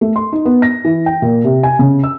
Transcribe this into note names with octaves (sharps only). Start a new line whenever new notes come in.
A3
C6
D#4
B3
A#6
E3
G5
A#2
C3
G#5
C#3
E6